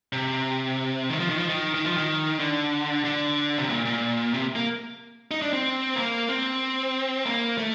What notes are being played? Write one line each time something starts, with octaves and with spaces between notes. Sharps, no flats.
C3
D#3
F3
D#3
F3
D#3
D#3
F3
D#3
D3
D3
C3
A#2
A#2
C3
A#3
D#4
D4
C4
A#3
C4
A#3
A3